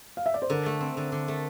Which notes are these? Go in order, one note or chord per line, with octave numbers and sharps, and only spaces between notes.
F5
E5
D5
C5
D3 A#4
A3
C4
D3
D3
A3